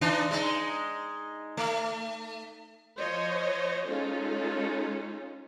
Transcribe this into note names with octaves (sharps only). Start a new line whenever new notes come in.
E3 D4 D#4
G#3 D#4
A3
F3 C5 C#5 D#5
G#3 C#4 D#4 F4 A4